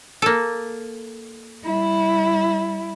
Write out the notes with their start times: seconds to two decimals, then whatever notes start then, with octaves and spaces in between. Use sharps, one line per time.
0.22 A#3 A4
1.64 G3 E4